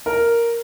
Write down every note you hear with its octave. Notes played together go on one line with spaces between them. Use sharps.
A#4